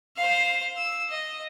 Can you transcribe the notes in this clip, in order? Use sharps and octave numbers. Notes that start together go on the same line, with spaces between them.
C5 F5
E6
D#5